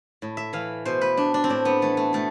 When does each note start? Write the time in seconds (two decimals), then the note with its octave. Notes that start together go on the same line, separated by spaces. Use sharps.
0.22 A2
0.37 E5
0.53 E3 F5
0.85 B2 C5
1.01 B4
1.17 D4
1.34 D4
1.44 C4
1.49 A2 D4
1.65 B3
1.82 E3 A3
1.97 A3
2.13 B2 A3